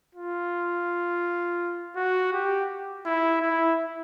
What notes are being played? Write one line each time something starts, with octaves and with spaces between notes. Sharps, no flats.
F4
F#4
G4
E4
E4